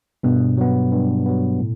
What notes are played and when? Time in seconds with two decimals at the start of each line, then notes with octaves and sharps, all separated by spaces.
0.23 G2 B2
0.57 F#3 B3
0.92 G2
1.26 F#3 B3
1.60 A2